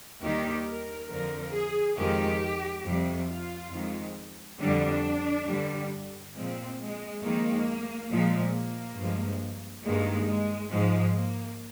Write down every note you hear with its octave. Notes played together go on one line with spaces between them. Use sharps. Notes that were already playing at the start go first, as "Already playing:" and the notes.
D#2 D#3 G3 G4
A#4
F2 D3 F3 A#4
G#4
F2 D#3 G#3 G4
F2 C3 G3
F4
F2 D#3 G#3
F2 D3 G3 D4
G2 D3 G3
A#2 F3 G#3 C4
G#3
F2 D#3 G#3 A#3
A#2 F3 G#3
A#3
G2 F3 G#3
G2 D#3 G#3 A#3
G#3
G#2 F3 G#3
A#3